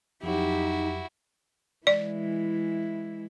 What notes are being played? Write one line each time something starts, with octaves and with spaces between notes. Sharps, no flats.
F2 F#3 D#4 E4 F#4 G4
E3 G#3 E4 D5